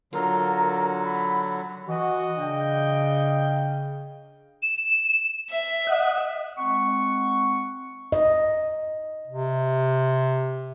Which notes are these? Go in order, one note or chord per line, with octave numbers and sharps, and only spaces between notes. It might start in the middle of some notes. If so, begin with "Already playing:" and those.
D3 F#3 F4 A#4
B5
E3 F#4 D#5
C#3 D4 G5
E7
E5
D#5 F#5
G#3 C4 F#5 C#6
D#5
C3